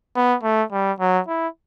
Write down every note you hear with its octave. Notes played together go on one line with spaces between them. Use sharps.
B3
A3
G3
F#3
E4